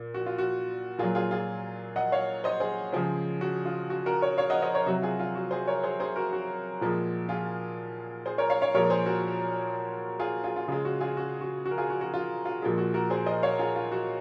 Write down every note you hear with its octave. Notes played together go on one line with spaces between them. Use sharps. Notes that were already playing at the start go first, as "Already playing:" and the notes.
Already playing: A#2
F#4
F4
F#4
A#2 F#3 F4 G#4
F4 G#4
F4 G#4
D#5 F#5
C#5 F5
C5 D#5
G#4 C5
C#3 F3 G#3 G#4 C5
F#4
F4
F#4
F#4 A#4
A#4 C#5
C#5 F5
D#5 F#5
C5 D#5
A#4 C#5
C3 F#3 F#4
F4 G#4
F4
F#4
G#4 C5
A#4 C#5
G#4 C5
G#4 C5
F#4 A#4
F#4
A#2 F3 G#3
F4 G#4
G#4 C5
A#4 C#5
C#5 F5
C#5 F5
A#2 F3 G#3 A#4 C#5
G#4 C5
F#4 A#4
F4 G#4
F4 G#4
F4
C#3 G#3 F4
F#4
F4 G#4
F#4
F#4
F#4
A#4
F4 G#4
F#4
F#4
F4
F4
A#2 F3 G#3
F#4
F#4 A#4
G#4 C5
C5 D#5
C#5 F5
F4 G#4
F4
F#4